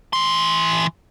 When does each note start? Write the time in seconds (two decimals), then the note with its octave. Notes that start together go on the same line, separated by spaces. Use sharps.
0.13 E3 C6